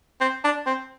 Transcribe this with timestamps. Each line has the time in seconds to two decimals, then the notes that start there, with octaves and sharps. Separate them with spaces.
0.21 C4
0.44 D4
0.66 C4